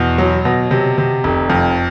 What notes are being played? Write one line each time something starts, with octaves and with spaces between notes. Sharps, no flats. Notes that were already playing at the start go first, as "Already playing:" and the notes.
Already playing: E2 B2
F#3
B2
C3
C3
F1
F2